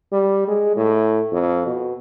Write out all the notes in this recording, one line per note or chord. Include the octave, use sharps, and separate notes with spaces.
G3
G#3
A2
F2
B2